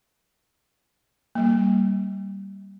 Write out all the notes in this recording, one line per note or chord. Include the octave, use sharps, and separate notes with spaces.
G3 A#3